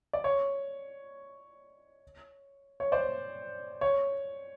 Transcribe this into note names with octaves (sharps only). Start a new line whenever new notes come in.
D5
C#5
C#5
C5 D5
C#5